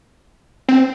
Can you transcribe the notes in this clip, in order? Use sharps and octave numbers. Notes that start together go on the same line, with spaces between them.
C4